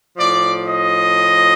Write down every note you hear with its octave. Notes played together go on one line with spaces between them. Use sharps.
A2 F3 D5
D#5